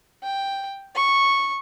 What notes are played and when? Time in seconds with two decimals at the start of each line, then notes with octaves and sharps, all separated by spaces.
0.23 G5
0.95 C#6